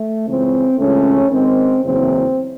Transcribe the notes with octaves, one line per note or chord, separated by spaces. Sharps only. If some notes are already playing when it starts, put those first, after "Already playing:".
Already playing: A3
C#2 C#3 E3 C4
C#2 C#3 E3 A3 C#4
G#1 G#2 D#3 C4
F#1 E2 C#3 E3 C4